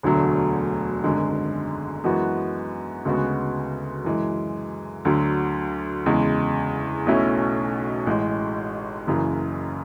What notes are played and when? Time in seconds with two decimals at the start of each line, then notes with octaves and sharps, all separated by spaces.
0.03 E1 D2 D3 F#3 A3
1.04 G#1 F#2 D3 G#3
2.04 F#2 E3 G#3 B3 F#4
3.05 D2 C#3 G#3 B3 F#4
4.05 F#2 E3 G#3
5.05 D2 D3 F#3
6.06 E2 C#3 G#3
7.06 B1 B2 A3 C#4 E4
8.07 A1 A2 G#3
9.07 F#1 F#2 C#3 E3